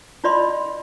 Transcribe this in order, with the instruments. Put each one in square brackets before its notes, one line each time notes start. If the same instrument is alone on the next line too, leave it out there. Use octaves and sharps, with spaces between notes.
[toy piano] E4 F4 D5 D#5 B5 C6